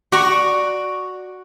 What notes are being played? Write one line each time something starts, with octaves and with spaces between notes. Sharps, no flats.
F#4 D5 A#5 C#6